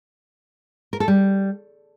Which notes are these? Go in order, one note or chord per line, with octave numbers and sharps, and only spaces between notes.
A#4
A4
G3